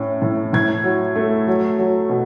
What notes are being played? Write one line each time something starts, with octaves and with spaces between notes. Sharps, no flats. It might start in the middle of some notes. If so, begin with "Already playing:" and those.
Already playing: A2 C#4
A2
A2 G#6
F#3
A3
F#3
F#3
B2